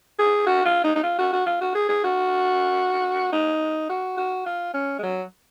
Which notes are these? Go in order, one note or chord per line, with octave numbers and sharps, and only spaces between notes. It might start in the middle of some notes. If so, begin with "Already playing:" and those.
G#4
F#4
F4
D#4
D#4
F4
F#4
F#4
F4
F#4
G#4
G#4
F#4
D#4
F#4
F#4
F4
C#4
G#3
F#3